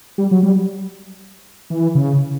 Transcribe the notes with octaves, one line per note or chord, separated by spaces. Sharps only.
G3
F#3
G3
E3
C#3